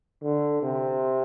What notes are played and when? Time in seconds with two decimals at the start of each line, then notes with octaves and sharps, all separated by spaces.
0.23 D3
0.62 C3